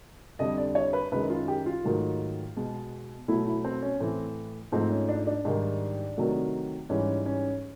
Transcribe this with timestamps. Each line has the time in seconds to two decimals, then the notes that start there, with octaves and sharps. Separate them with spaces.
0.39 F2 D3 G3 D#5
0.58 D5
0.75 C#5
0.93 B4
1.12 F#2 D#3 G#3 B4
1.30 F4
1.48 G4
1.66 F4
1.84 G#2 D#3 F#3 A3
2.56 B2 G#3
3.28 B2 F#3 A3 E4
3.46 E4
3.64 C4
3.82 C#4
4.00 A2 E3 A3 C4
4.72 G#2 F3 A3 C4
4.90 C#4
5.09 D4
5.27 D4
5.45 G#2 D#3 G3
6.17 C3 D#3 F#3 A3
6.89 G#2 E3 G3 C#4
7.26 C#4